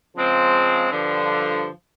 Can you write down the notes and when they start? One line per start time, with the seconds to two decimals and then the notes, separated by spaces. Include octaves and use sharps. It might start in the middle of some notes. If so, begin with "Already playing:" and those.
0.15 C#3 F3 G#3 C4
0.91 G2 D3 F3